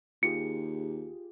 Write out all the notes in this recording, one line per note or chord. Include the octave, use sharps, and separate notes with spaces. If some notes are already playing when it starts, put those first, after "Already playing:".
D#2 F4 G4 G#4 C#7